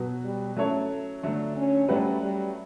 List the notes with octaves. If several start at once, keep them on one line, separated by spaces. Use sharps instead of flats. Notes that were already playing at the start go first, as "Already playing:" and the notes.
Already playing: B2 F#3 B3 F#4
G3
F#3 A3 C#4 E4 A4 C#5
D3 F#3 A3 D4
C#4
F#3 G3 A3 C#4 F#4 B4
G3